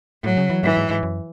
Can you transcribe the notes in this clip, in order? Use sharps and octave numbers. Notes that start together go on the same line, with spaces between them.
A2 F#3
C#3
E3
G#2 E3
G#2
G#2
F#2